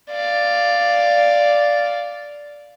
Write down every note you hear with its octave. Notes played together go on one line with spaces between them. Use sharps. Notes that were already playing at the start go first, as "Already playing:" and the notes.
D5 F5